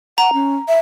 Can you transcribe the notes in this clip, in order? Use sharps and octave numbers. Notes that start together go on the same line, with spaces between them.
F#5 A#5
C#4
E5